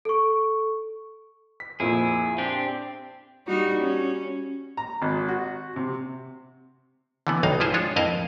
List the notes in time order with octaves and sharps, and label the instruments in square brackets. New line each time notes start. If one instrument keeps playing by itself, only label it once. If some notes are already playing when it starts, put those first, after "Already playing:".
[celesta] A4 C#6
[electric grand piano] B6
[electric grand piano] F2 A#2 [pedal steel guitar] E4 G#4
[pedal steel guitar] C4 D4 G4
[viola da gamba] G3 D#4 F#4
C#4
[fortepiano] A#5
G#1
F#4
C3
[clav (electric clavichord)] D3 E3 B3
B1 G2 D#3 D#4 F5
F3 E4 G#4 C5 A5
G#3 D4 F4 C#5
F2 E4 A#4 C5 D#5 F5